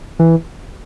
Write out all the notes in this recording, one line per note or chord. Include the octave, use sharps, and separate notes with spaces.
E3